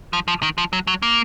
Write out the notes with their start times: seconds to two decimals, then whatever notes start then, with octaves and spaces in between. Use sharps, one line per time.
0.13 F3
0.28 F3
0.43 D#3
0.58 F3
0.73 F#3
0.87 F#3
1.02 A#3